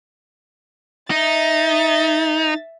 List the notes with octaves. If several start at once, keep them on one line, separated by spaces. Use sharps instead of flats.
D#4 E5 A6